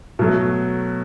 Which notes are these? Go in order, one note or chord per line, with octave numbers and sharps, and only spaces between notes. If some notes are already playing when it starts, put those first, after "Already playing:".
B2 F#3 A3